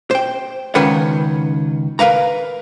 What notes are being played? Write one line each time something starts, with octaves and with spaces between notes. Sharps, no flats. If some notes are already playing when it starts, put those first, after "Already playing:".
C5 G5
C#2 D#3 C#4 B4 F#5
A#4 B4 F5 A#5